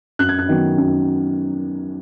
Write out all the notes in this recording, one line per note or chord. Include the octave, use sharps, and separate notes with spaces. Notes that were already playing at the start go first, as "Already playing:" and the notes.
F#2 F#6
G#6
F#6
D#3 F#3 B3
F#2